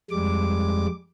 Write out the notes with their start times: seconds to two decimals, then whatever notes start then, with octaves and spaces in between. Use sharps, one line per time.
0.11 F2 G3 G#3 D6